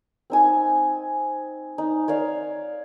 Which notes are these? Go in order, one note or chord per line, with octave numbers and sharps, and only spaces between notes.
C4 D#4 G#5
D#4
C#5 D5 F5